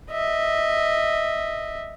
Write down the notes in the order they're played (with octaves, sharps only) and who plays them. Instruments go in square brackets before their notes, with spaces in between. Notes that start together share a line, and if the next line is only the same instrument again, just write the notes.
[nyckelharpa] D#5 E5